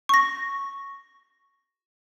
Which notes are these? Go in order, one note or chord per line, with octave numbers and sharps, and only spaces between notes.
C#6 A#6